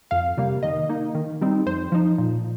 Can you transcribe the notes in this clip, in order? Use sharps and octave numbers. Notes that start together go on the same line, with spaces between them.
F2 F5
C3 G3 A#3
D#3 D#5
A#3 D#4
D#3
G3 C4 D#4
F2 C5
F3 D#4
A#2